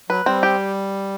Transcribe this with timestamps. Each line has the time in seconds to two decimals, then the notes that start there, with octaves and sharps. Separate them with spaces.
0.10 F#3 B4
0.26 G3 C4
0.43 G4